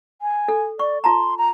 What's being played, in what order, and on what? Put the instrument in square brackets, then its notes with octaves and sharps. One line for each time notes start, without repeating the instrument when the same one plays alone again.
[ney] G#5
[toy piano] A4
[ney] D5 [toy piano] C#6
[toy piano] F4 A5 A#5 [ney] C6
[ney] A#5